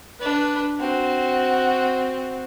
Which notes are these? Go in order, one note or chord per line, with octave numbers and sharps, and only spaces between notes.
D4 B4
C4 F#4